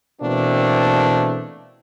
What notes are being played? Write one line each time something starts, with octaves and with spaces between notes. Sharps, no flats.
B2 E3 A3 A#3 C4 D4